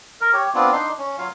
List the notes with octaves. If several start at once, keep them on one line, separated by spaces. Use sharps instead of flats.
A#4
G4 C#5
B3 C4 D4 F4
D4 D#4 C6
C#4
F#3 F4 F5